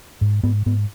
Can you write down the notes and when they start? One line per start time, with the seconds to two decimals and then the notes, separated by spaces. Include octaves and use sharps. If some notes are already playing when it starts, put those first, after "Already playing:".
0.21 G#2
0.43 G#2 B3
0.66 G#2 B3